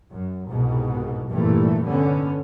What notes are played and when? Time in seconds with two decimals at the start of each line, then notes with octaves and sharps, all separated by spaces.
0.10 F#2
0.48 C2 G#2 B2
1.30 F1 A#1 G2 A#2 E3 A3
1.83 D3 B3 C#4